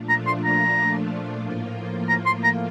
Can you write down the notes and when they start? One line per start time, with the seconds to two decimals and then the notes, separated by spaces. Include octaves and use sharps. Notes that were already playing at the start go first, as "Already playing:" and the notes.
Already playing: A#2 F3 A3 D4 F4
0.09 A#5
0.27 C6
0.44 A#5
1.36 A2 F3 A#3 F4
2.09 A#5
2.26 C6
2.44 A#5